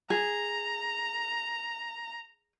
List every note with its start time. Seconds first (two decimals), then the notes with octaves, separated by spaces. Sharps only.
0.10 G#4 A#5